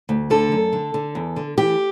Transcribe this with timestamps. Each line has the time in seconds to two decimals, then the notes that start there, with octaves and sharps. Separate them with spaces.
0.09 D2
0.30 D3 A4
0.52 F#2
0.73 D3
0.94 D3
1.15 E2
1.36 D3
1.58 E3 G4